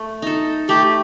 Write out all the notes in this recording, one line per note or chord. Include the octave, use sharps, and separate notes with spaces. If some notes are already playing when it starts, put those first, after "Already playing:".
Already playing: A3
D#4 A4
A3 G4